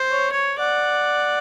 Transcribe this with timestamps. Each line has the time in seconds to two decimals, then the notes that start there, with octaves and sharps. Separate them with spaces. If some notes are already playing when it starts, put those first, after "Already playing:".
Already playing: C5
0.12 C#5
0.32 C#5
0.59 D5 F#5